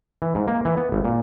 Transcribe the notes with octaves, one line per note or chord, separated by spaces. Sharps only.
E3
G#2
A#3
E3
B3
G#1
A#2